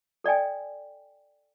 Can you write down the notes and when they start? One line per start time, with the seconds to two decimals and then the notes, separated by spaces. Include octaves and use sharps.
0.24 A4 D5 D#5 G5 G#5